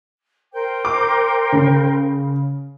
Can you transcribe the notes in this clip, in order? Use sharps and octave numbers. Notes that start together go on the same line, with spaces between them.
A#4 C5 G5
D6
C#3